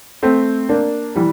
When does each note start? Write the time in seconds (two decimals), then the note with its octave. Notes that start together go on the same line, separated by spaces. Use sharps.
0.23 A3 C4
0.69 A#3 D4
1.15 E3 G3